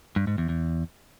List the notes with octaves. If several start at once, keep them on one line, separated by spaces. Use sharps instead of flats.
G2
G#2
E2
E2